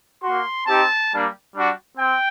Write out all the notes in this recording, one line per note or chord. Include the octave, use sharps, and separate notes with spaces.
A#3 F#4 C6
C4 D#4 G4 A5
G3 A#3 D4
G3 D4 F#4
C4 G5